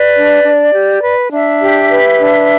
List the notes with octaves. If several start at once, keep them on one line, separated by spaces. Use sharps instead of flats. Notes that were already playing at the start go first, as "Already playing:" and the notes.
Already playing: B4 D5
D4
D4
G4
B4
D4 E5
G4
B4
D4